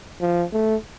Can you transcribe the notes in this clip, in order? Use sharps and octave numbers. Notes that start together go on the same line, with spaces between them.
F3
A3